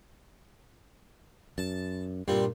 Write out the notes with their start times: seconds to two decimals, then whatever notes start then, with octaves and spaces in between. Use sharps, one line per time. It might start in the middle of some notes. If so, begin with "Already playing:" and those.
1.58 F#2 A5
2.28 G2 A#2 G3 C4